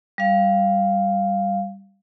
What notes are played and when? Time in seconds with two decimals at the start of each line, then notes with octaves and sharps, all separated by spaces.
0.18 G3 F5